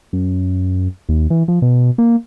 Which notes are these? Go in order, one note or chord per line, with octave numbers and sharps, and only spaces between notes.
F#2
D#2
E3
F3
B2
A#3